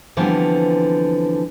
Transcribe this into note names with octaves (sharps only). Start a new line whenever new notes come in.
D3 E3 F3 G3 B3 C4